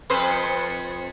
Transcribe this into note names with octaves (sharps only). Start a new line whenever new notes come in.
F2 B4 C5